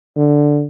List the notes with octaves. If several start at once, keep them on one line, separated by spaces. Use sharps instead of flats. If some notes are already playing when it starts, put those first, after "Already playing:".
D3